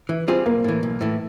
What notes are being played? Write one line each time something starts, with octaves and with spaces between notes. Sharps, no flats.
E3
G3 C4 F4 G#4
B1 A#3
A2 E3
B1
A2 E3